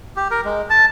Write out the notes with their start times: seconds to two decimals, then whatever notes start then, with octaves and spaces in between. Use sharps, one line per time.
0.17 G4
0.31 A#4
0.45 G#3
0.70 A5